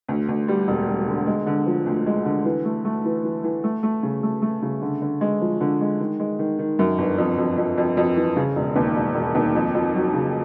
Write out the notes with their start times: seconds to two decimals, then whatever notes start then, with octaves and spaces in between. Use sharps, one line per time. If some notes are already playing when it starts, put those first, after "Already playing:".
0.08 D2
0.28 D2
0.48 G3
0.68 E1
0.88 G3
1.08 D3
1.27 G#3
1.47 D3
1.66 F3
1.86 D2
2.06 G#3
2.25 D3
2.45 E3
2.65 A3
2.85 A3
3.04 E3
3.24 E3
3.44 E3
3.64 A3
3.83 A3
4.03 C#3
4.23 A3
4.42 A3
4.62 C#3
4.82 D3
5.02 D3
5.21 G#3
5.41 F3
5.61 D3
5.81 G#3
6.00 D#3
6.20 G#3
6.39 D#3
6.59 D#3
6.79 F#2
6.98 G1
7.18 F2
7.38 F2
7.58 F2
7.78 F2
7.97 F2
8.16 E3
8.36 C#3
8.56 E1
8.76 D#2
8.96 E1
9.15 E1
9.35 D#2
9.55 F2
9.74 F2
9.94 F#3
10.14 C#3